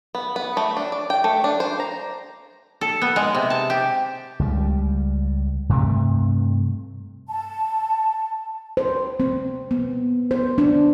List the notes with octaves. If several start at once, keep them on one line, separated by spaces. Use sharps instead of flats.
B3
B3
A3
D4
D5
G5
A3
D4
C5
A#5
A4
B3
G#3
C3
A5
G4
C#2 G3
G2 C3 A3
A5
C5
C4
B3
C5
D4